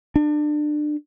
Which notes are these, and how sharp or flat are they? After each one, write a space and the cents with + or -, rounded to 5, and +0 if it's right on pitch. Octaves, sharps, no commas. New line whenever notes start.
D4 +25